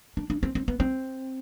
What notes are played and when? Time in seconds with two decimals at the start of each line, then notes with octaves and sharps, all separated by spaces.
0.17 D4
0.30 D4
0.43 C4
0.55 C4
0.68 B3
0.80 C4